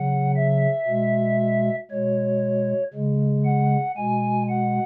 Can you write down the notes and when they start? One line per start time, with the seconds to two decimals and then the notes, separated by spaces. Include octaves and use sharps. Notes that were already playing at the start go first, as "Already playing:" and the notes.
Already playing: C#3 F#3 F#5
0.36 E5
0.88 B2 G#3
1.91 B2 G#3 C#5
2.94 C#3 G#3
3.45 F#5
3.97 B2 G#3 G#5
4.49 F#5